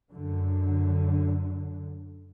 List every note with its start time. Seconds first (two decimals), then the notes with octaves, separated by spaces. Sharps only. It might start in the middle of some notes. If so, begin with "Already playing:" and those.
0.11 F#2 D3